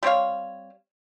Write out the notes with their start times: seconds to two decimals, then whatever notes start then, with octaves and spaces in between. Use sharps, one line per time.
0.03 G3 C4 C#5 F5